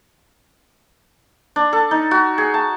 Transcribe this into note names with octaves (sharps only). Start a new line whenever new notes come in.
D4
A4
D#4
F#4
G#4
A5